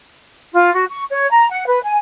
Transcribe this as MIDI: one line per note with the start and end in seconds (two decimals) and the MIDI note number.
0.53 0.74 65
0.75 0.85 66
0.90 1.04 85
1.11 1.29 73
1.31 1.47 82
1.49 1.64 78
1.67 1.80 71
1.83 1.97 80